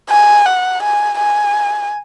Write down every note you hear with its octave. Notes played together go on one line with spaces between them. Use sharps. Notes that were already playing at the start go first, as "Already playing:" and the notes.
G#5
F#5
G#5
G#5